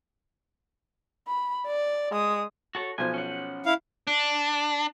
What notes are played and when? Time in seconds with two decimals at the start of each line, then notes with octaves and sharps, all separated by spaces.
1.27 B5
1.66 D5
2.12 G#3 D#6
2.75 F#4 A4 C#5
2.98 B1 F3 C5 G#5
3.14 C#4 F#5
3.66 E4 F5
4.07 D4